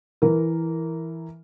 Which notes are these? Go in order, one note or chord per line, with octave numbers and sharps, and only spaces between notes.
E3 A#4